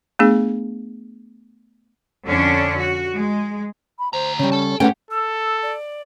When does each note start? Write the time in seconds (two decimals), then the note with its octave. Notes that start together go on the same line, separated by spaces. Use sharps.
0.19 A3 B3 D4 G#4
2.28 F2 D3 C#4 D4
2.78 F#4
3.15 G#3
3.99 B5
4.13 D2 C5 A#5
4.39 C#3 G3 C#4
4.52 A4 A5
4.80 G#2 C#3 A3 C#4 G4 B4 F#5 G5
5.11 A4 E6
5.62 D5